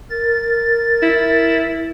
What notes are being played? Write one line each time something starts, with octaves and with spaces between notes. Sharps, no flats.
A#4 A6
E4